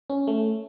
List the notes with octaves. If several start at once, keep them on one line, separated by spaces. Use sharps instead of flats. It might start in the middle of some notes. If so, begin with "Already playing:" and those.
C#4
A3